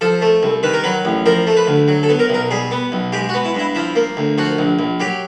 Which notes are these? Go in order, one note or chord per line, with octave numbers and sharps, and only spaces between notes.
F3 A4
A3
C2
D#3 B4
A#4
F#3 B4
A1
F3 A#4
A3
B4
D2
F#3
A4
B3
A#4
B1 A#4
G3 G#4
B3
B1
G#3 G4
F#4
B3
E4
G2 E4
F3 E4
A#3
D2
F3 F#4
A#1
A#1
F#3 G4